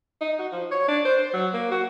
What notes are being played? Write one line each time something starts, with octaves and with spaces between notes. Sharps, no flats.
D#4
F#4
F3
C#5
D4
C5
C5
F#3
A#3
F#4